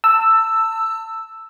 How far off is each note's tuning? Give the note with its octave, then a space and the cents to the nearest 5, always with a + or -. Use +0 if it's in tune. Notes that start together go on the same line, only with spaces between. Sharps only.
A5 +30 E6 +0